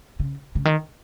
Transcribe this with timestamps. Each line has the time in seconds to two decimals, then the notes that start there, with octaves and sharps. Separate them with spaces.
0.20 C#3
0.55 C#3
0.65 D#3